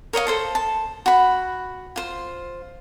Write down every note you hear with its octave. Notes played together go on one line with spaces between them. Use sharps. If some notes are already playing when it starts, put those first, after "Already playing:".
A#4 C#5 D#5 F5
A4 C5 A5
A5
F#4 B5
F4 C5